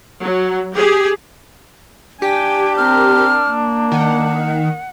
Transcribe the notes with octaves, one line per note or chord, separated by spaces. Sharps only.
F#3
G4 G#4
D4 G4 G5 G#5
C4 A#4 F6
A#3
D#3 F#5